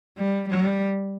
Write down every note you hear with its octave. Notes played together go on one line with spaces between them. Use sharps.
G3
G3